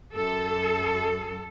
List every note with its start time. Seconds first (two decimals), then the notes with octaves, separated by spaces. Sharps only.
0.14 F#2 A4